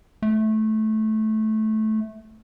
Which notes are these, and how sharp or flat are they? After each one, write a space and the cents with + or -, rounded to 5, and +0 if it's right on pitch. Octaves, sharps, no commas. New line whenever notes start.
A3 -15